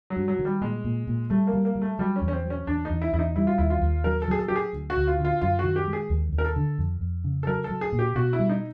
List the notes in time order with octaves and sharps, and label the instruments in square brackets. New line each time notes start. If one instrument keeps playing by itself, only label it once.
[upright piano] F#3
[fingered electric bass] G2
[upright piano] F#3
[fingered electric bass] D#3
[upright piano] G3
[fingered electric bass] A#2 [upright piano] G#3
[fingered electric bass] A#2
A#2
[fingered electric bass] G3 [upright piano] A3
[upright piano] A#3
[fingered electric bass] G3
[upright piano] A#3
[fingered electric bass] G3
[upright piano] A3
[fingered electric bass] F#3 [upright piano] G3
[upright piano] C#4
[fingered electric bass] E2
[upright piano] C#4
C4
[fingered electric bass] F#3
[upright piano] C#4
[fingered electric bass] E2 [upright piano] D4
[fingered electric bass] E2 [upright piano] D#4
[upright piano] E4
[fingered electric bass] E2 [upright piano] E4
[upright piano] D#4
[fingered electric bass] G3 [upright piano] E4
[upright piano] F4
[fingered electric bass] D#2 [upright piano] E4
[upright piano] F4
[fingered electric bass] D#2
[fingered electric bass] F#3 [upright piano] A#4
[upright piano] A4
[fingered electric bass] F#3 [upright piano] G#4
[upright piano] A4
[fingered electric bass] F#3 [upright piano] G4
[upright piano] G#4
[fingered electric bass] D2
[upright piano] F#4
[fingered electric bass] D2
[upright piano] F4
[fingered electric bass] D3
[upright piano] F4
[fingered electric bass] F#2 [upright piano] F4
[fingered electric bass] D#3 [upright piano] F#4
[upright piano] G4
[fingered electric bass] G#3
[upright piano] G#4
[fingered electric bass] D#2
D#2
[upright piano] A#4
A4
[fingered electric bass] D3
F2
F2
C#3
[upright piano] A4
[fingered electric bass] F#3 [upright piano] A#4
[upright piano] A4
[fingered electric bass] F#3
[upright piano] G#4
[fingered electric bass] A#2
[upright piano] G4
[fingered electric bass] B2 [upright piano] F#4
[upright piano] E4
[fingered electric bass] G3
[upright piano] D#4